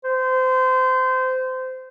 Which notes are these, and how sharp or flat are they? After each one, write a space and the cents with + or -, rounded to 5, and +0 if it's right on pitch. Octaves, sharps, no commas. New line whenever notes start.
C5 -25